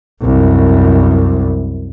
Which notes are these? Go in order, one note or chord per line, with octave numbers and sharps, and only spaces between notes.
C2 F#2